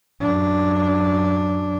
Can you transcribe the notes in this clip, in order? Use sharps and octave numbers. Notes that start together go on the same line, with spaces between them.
F#2 D4